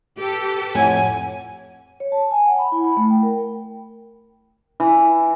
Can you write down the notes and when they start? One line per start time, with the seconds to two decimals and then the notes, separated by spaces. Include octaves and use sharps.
0.17 G4 A4 B4
0.75 F2 A2 C#5 F#5 G#5
2.00 C#5
2.12 A5
2.31 G#5
2.46 F#5
2.58 B5
2.72 E4
2.84 B5
2.97 A3
3.10 G5
3.23 A#4
3.39 G5
4.80 E3